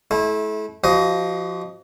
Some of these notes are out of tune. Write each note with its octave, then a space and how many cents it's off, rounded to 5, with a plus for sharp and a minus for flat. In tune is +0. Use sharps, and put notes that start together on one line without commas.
A3 -35 E4 -15
F3 +0 F#4 +40 D#5 +5